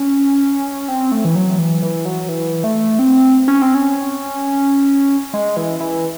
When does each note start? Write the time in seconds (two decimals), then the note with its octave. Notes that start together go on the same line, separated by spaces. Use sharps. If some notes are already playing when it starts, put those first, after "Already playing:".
Already playing: C#4
0.88 C4
1.12 A3
1.25 E3
1.35 F#3
1.59 E3
1.82 E3
2.05 F#3
2.29 E3
2.64 A3
2.99 C4
3.48 C#4
3.62 C4
3.75 C#4
5.34 G#3
5.57 E3
5.80 E3